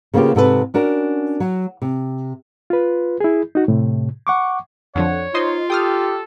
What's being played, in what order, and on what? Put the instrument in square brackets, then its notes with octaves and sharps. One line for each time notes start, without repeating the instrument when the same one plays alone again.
[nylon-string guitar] C#3 A#3 B3 F4 G4
G#2 C3 A4 B4
C#4 D4 F#4 A#4
F#3
C3
[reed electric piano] F4 B4
E4 G#4
D#4 F#4
A2 C3
F#5 C#6 D6
[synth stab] F2 D3 F3 [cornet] C#5 [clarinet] F#5
[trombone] D#4 [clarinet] F4 [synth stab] C5 D#5 C6
[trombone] G4 [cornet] A4 [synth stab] G5 D#6 F6